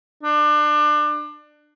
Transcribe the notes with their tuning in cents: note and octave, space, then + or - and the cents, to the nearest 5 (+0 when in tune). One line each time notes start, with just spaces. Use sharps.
D4 +25